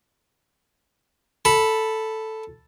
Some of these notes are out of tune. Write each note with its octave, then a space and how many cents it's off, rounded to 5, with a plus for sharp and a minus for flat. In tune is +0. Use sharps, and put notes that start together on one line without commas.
A4 +0 B5 +0